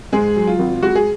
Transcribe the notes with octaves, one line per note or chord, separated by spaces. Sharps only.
G#2 G#3 G#4
F#3
F4
G#1
G#3 F#4
G#4